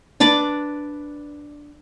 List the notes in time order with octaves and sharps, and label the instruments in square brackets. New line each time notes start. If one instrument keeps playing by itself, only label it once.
[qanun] D4 B4 D5 D6